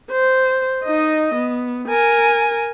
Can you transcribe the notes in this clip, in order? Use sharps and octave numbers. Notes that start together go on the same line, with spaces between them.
C5
D#4 D#5
B3
A#4 G#5